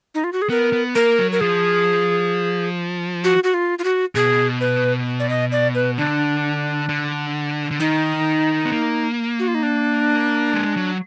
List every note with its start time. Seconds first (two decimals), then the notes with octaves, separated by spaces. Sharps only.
0.15 D#4
0.24 F4
0.33 F#4
0.42 G#4
0.50 B3 A#4
0.72 B3
0.95 A#3 A#4
1.19 F#3
1.32 A#4
1.41 F3 G#4
3.24 F#4
3.44 F#4
3.54 F4
3.79 F4
3.84 F#4
4.15 B2 G#4
4.61 B4
5.20 D5
5.29 D#5
5.52 D5
5.75 B4
5.98 D3 D4
6.89 D3
7.71 D3
7.80 D#3 D#4
8.65 B3
8.72 A#3
9.39 F#4
9.48 F4
9.55 D#4
9.63 D4
10.54 G#3
10.77 F#3